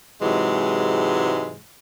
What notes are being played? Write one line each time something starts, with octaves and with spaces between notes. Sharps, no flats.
G#2 C3 E3 F#3 G#3